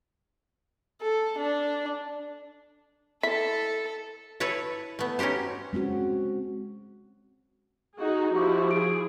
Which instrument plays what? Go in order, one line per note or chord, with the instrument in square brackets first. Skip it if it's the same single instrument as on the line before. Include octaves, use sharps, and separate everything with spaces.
[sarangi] A4
D4
[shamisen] E4 [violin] A4 [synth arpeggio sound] B6
[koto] E4 A4 B4 C#5 E5
A3 B3
C#4 D#4 F#4 G4 C5
[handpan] G#3 C4 C#4 F#4
[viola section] D#4 F#4 G#4
[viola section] F3 E4 F#4 [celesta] G4 C#6 D6
[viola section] G#4 [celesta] D7